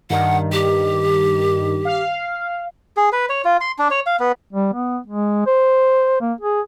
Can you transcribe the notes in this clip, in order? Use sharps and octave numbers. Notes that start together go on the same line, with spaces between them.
G2 D#3 F#5
G4
F5
G#4
B4
C#5
F4
C6
D4
C#5
F5
B3
G3
B3
G#3
C5
A#3
G#4